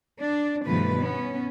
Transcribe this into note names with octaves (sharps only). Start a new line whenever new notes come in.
D4
G2 B2 D#3 F3 A3 B4
B3 C#4